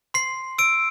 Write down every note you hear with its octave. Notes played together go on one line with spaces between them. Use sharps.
C6 C7
E6 D7